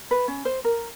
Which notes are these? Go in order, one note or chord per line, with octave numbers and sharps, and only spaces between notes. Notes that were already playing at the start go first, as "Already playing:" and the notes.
B4
C#4
C5
A#4